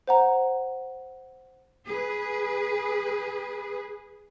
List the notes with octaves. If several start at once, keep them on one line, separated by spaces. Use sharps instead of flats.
C5 F#5 A#5
G#4 B4